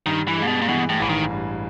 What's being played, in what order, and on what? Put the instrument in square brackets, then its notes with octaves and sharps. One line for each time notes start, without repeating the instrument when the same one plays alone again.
[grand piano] G2 [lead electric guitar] D#3
[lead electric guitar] E3
[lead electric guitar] A#2 [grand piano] G#3
[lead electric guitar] B2
A#2
[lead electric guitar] B2 [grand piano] E3
[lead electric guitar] A2
[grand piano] A1 [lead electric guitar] E3
[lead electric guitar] D#3
[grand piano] G2